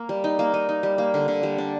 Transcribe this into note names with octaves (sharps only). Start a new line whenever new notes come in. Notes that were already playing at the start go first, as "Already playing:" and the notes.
Already playing: A#3
G3
D#4
A#3
D#4
D#4
G3
A#3
D3
D3
G3
D4